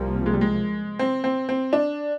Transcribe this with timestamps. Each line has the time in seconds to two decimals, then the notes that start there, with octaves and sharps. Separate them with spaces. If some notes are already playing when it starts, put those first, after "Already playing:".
Already playing: C2 C3 F3 G3 A#3
0.26 G#3
0.34 G3
0.41 G#3
0.99 C4
1.24 C4
1.49 C4
1.73 D4